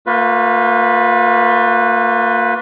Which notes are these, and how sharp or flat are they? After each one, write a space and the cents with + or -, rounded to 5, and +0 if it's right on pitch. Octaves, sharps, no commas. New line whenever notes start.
A#3 -35 F4 +35 B4 +0